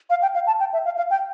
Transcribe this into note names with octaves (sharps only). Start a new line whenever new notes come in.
F5
G5
F5
A5
G5
E5
F5
F5
G5